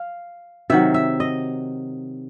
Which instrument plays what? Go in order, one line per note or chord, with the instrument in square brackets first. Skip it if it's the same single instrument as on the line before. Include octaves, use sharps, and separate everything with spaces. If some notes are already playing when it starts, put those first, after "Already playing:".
Already playing: [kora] F5
C3 D#3 F#3 E5
E5
D#5